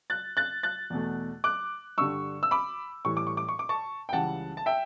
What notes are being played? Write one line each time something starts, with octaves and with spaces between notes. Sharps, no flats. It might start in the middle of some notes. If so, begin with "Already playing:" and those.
F#6 A6
F#6 A6
F#6 A6
E2 B2 A3
D6 F#6
G2 D3 G3 C#6 E6
E6
B5 D6
A2 E3 G3 C#6
D6
C#6
D6
C#6
D6
A5 C#6
G5
C#2 C#3 E3 G3 F#5 A5
A5
E5 G5